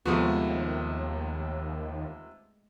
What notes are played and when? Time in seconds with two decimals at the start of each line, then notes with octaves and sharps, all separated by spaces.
0.06 D#2 C3 F3 G#3 A3 B3 F#4